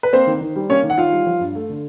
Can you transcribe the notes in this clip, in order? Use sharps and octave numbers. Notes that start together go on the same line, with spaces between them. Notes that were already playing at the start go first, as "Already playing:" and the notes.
B4
A#3 C4 C5
D#3
D#3
G3
A#3 C#4 C#5
D#3
F#5
D#3 F4 F5
G3
F3
G2
A3
D3